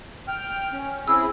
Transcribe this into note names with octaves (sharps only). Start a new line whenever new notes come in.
G5 F6
C#4
C4 E4 G#4 E6